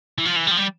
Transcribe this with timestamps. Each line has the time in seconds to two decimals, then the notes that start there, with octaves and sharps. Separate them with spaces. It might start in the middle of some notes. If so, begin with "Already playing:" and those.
0.18 E3
0.25 F3
0.36 E3
0.47 G3
0.51 F3
0.57 G3